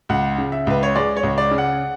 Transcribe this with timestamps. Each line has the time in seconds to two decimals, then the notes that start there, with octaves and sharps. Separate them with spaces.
0.09 C#2 F#5
0.38 C#3
0.52 E5
0.67 C#2 B4
0.83 C#5
0.95 G#3 D5
1.17 C#5
1.23 C#2
1.38 D5
1.51 C#3
1.58 F#5